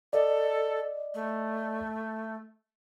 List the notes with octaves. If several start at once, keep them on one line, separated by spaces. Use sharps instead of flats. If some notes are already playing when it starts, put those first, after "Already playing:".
A4 D5 D#5
A3